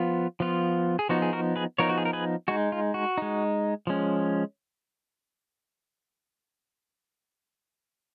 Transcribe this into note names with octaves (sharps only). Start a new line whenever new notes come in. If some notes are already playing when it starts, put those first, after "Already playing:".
Already playing: F3 B3 F4
F3 B3 F4
G#4
F3 B3 D#4 F#4
G#4
F#4 A#4
G#4 B4
F3 B3 D#4 A#4 C#5
F#4
G#4
A#4
G#4 B4
G#3 D#4 F#4
F4
F#4
G#3 D#4
F3 G#3 C#4